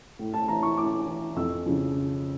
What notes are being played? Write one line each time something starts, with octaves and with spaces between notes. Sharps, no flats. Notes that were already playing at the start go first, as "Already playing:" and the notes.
A2
A5
E3 A#5
C#6
A2 D6
E3
F2 E6
C#3 F3